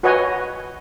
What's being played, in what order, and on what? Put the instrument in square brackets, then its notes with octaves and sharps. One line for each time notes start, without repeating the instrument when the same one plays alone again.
[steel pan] F#4 B4 C#5 D#5 F#5 G#5